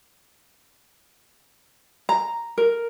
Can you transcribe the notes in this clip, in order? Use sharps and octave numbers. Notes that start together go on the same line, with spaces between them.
A#5
A#4